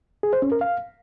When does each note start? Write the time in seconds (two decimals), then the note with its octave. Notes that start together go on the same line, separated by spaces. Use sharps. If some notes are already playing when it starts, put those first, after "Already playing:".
0.23 G#4
0.33 C5
0.42 C#4
0.52 A#4
0.61 F5